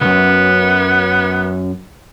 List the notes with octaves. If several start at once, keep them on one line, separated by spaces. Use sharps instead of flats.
C2 F#2 B3